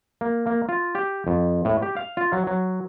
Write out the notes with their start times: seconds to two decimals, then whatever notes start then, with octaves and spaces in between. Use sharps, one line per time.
0.21 A#3
0.46 A#3
0.69 F4
0.95 G4
1.27 F2
1.65 A2
1.82 G4
1.96 F5
2.17 F4
2.33 F#3
2.47 F#3